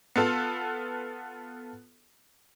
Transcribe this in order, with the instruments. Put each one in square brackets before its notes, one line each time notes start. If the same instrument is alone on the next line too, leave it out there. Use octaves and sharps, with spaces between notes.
[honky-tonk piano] B3 F4 A4